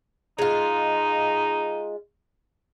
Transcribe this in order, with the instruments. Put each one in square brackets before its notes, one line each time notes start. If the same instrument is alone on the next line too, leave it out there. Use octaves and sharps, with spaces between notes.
[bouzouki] G#3 F4 [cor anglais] D#4